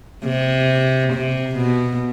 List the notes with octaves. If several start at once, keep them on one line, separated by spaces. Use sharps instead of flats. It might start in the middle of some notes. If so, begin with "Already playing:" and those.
C3
C3
B2